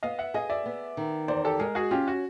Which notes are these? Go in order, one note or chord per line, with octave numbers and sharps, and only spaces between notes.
B3 D#5 F5
E5 F#5
G#4 D#5 F5
D5 E5
B3
D#3
E2 C5 D5
G4 A4
G#3 G#4 A#4
F#4 G#4
C#4 F4 G4
F#4